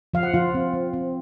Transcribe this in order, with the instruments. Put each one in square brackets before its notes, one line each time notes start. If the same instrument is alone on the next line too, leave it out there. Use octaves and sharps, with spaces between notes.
[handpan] F3 F5
F#5
F3 F4 F5
C4
C4
C4